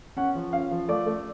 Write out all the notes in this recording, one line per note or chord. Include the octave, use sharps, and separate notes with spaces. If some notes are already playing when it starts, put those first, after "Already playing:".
C#4 F#5
F3
C#4 F5
F3
A3 D5
A3